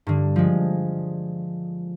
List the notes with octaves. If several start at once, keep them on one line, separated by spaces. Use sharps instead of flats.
G2 D3
F3 G#3